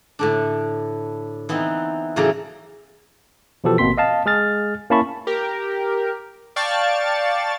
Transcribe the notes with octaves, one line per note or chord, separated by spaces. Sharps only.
A2 D3 D4
E3 B3 C4 D#4
A2 C#3 E3 F#3 D5 A#5
B2 E3 F3 G4 A4 B4
G#1 B2 A#3 C4 C6 B6
D#5 F5 A5
G#3 G#4 F6 A6
A#3 C#4 E4 A5 B5 C#6
G4 A#4
D5 F5 G5 A5 C#6 A6